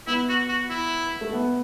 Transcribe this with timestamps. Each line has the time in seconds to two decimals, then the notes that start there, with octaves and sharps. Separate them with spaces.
0.07 B3 E4
0.29 F#4
0.49 F#4
0.70 E4
1.21 A3
1.33 B3